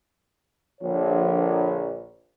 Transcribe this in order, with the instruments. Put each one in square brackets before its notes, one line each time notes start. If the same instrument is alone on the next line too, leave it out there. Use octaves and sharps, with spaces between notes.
[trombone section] A#1 [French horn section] D3 F3 C#5